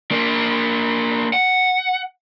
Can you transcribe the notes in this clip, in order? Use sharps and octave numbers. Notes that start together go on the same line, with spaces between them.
A#3 D4
F#5